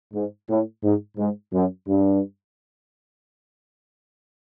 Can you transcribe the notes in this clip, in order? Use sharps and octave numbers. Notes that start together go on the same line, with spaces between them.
G#2
A2
G#2
G#2
F#2
G2